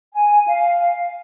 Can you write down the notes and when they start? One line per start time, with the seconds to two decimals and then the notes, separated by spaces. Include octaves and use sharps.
0.13 G#5
0.47 F5